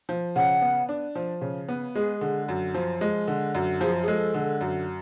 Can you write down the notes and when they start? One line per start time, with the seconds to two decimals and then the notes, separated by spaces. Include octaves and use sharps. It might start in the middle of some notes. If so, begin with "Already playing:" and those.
0.09 F3
0.35 C#3 F#5
0.61 B3
0.89 D4
1.15 F3
1.41 C#3
1.68 B3
1.95 G#3 G#4
2.21 D3
2.48 F#2
2.74 F3
3.01 G#3
3.28 D3
3.55 F#2
3.81 F3 G#4
4.02 G#4
4.07 G#3 A4
4.34 D3
4.61 F#2